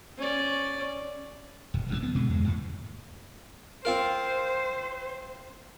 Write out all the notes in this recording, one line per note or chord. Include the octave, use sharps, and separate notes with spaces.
C#4 D5
D#1
F#1 F2 G#2 D3
D1 B3
B2 D3 G3 G#3
E2 G#3
E2 A2
C4 F4 A#4 C5